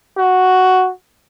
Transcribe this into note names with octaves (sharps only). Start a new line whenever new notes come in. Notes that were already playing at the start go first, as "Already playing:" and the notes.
F#4